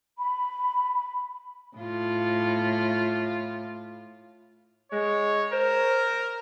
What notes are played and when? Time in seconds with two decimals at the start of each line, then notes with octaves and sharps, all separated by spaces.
0.19 B5
1.77 A2 F4
4.92 G#3 C#5
5.53 A#4 C5